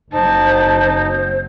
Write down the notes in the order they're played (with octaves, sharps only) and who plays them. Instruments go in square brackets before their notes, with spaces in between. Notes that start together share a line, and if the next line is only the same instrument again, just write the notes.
[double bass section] F#1 F#3 C4 [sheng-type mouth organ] D#4 [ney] C5 [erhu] A5